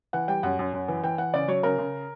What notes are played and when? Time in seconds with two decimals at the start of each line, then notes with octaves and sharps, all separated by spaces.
0.13 E3 F#5
0.28 G3 G5
0.43 F#2 F#5
0.59 F#2
0.73 F#2
0.88 E3
1.04 E3 G5
1.18 E3 F#5
1.33 C#3 D5
1.48 F#3 C#5
1.63 C#3 A#4
1.78 C#3